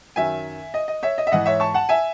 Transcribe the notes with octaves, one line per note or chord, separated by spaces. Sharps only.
F#2 D#3 F#3 E5 G#5
D#5
D#5
C#5 E5
D#5
E5
G#2 E3 D#5 F#5
C#5 E5
A5 C#6
F#5 A5
E5 G#5